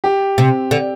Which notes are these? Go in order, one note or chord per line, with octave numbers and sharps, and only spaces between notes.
G4
C3
D3